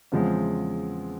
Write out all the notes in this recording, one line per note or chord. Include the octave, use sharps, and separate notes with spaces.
E2 C#3 F3 G#3 C4